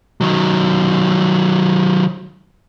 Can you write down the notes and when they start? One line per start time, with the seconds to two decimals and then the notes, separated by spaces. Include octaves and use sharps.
0.21 D#3 F#3